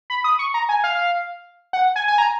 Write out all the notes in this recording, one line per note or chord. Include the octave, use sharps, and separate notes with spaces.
B5
D#6
C#6
A#5
G#5
F5
F#5
G#5
G#5
A#5